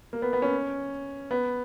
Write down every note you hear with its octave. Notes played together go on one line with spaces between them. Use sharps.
A#3
B3
B3
C#4
B3